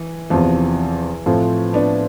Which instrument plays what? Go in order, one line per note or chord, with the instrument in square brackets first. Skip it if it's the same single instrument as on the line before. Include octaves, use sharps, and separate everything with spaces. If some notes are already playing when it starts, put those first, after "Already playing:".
Already playing: [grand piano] E3
[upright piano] E2 C3 F3 [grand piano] E3
[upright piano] A2 F3 A3 C4 F4
[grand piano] B3 D4